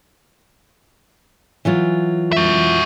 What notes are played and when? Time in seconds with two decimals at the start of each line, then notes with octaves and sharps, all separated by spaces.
1.65 E3 F#3 F4
2.33 F#4 E5